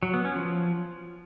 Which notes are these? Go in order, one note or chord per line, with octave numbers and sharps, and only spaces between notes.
F#3
B3
C#4
F3